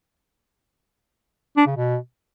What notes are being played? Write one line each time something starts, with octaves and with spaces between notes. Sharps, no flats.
D4
C#3
B2